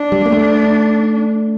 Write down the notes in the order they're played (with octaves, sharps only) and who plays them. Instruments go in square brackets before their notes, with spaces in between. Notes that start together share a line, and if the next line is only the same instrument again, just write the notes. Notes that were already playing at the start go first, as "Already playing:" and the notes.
Already playing: [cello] D4
[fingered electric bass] G3
A#3
A3